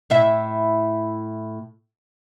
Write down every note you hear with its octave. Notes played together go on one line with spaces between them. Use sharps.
A2 E4 E5